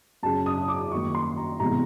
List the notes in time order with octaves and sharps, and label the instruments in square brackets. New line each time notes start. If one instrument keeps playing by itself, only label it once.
[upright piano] F#2 C#3 F#3 A5
D#6
D6
F#2 D#3 G3 A#3 C#6
C6
A#5
C3 E3 G#3 B3 A#5